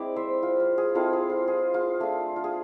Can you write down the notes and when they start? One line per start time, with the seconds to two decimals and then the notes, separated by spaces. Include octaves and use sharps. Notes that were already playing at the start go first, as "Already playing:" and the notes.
Already playing: G#3 C4 E4 D5
0.16 C5 E5
0.43 F4
0.60 F4
0.78 G#4
0.95 G#3 C4 E4 F4 A4
1.13 G#4
1.30 F4
1.48 G#4
1.74 F4
2.00 A3 D4 F4 G#4
2.36 F4
2.44 G#4